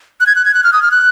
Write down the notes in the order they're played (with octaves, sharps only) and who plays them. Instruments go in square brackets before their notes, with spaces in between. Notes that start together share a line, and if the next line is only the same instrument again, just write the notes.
[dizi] F#6
G#6
F#6
G#6
F#6
F6
D#6
F6
F#6